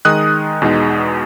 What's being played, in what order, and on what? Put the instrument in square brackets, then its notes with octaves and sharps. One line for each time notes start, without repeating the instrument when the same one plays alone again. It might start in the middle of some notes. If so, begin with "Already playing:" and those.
[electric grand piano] D#3 G#3 D#4 D#6 F#6
E2 B2 G#3 D#4